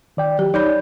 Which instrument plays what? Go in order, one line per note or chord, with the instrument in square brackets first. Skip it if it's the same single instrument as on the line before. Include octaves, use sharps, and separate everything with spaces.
[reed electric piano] D#3 D5 G5
[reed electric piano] F#3 [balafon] G4
[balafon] D#4 C#5 B5 [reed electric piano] D5 G6